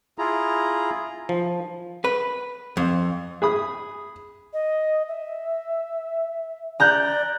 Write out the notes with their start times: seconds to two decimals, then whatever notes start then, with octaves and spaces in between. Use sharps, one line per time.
0.18 E4 F4 G#4 A#5
1.29 F3
2.04 B4
2.77 F2
3.42 G#4 B5 D#6
4.53 D#5
5.08 E5
6.80 D5 A#5 F#6 G6